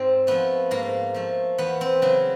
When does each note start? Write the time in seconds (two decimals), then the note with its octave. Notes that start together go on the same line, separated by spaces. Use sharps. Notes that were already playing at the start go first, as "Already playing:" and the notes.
Already playing: G#2 C4
0.27 F3 A3 B3
0.71 G#2 A#3
1.14 F3 A3
1.58 E2 B3
1.81 C4
2.02 C#3 F#3 B3